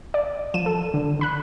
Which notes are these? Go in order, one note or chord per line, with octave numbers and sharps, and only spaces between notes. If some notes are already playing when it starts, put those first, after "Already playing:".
D5
F3 D#7 E7
A4
D3
D3 B5 F#6